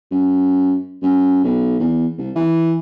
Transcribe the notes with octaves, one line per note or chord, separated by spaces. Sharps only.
F#2
F#2
B1
E2
C2
E3